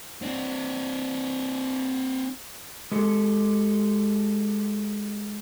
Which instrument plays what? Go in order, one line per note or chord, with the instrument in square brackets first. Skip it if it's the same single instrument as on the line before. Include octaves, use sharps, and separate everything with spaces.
[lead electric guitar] C4 D4
[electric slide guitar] G#3 G4 A4